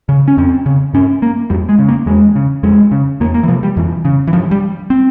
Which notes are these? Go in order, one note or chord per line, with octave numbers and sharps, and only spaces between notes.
C#3
C#4
F2 C4
C#3
G2 C#4
A#3
F2 G3
G#3
C#3
A#3
E2 G#3
C#3
F2 G#3
C#3
E2 A#3
A#3
E3
C3 F3
G3
F2 E3
C#3
E3
G2 F3
G3
C4